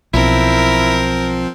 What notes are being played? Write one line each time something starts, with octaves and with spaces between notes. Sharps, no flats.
B1 F3 C4 E4 A#4